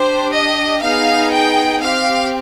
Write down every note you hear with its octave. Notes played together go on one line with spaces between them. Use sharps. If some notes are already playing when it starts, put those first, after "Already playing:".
Already playing: D4 G4 C5
D#5
B3 D#4 G#4 F5
G5
C4 G4 F5